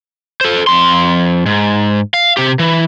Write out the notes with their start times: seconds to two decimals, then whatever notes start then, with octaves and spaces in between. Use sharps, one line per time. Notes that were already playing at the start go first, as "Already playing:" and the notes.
0.41 A4 C5
0.67 F2 C6
1.46 G#2
2.14 F5
2.37 C3 G4
2.59 E3